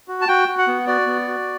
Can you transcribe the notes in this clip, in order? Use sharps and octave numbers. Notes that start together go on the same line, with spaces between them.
F#4
A5
F#4 G5
F#4
F#5
B3
F#4 D5
B3
F#4